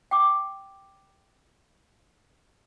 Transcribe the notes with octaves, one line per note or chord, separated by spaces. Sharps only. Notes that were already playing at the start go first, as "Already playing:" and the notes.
G5 D6